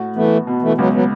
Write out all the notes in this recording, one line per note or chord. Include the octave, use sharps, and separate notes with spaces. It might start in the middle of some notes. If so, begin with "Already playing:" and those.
Already playing: A2 F#4
E3 A3 B3
B2
E3 A3
C#2 F#3 B3
F#3 B3